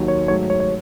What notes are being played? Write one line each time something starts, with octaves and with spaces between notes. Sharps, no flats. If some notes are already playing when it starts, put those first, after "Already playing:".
Already playing: D#2 D#3 F#3
C#5
G#2 F#3 A3 C#5
C#5
C#5